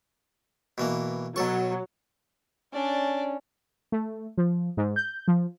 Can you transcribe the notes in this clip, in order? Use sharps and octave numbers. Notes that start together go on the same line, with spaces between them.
B2 E3 A#3
B2 F#3 A4 C#6
C#4 D4 D5
A3
F3
G#2
G6
F3